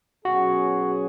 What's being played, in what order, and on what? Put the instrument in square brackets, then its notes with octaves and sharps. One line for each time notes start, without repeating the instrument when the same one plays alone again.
[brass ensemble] B2 F#3 C#4 G#4 [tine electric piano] F#4